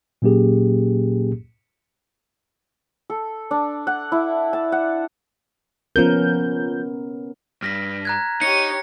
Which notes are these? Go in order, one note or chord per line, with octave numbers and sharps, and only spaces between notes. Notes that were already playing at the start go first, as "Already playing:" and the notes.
A#2 F#3 A#3 C#4 G4 G#4
A4
D4
F#5
E4
A5
F#5
F3 B3 C#4 A#4 G6
G2 F6 A#6 B6
A#5 F#6 G#6
D#4 G4 C#5 C#7